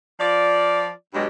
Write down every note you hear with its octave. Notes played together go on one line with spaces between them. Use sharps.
F3 F4 D5
G2 B2 F#3 G#3 G4